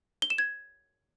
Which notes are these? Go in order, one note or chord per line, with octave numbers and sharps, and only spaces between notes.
G7
E7
G#6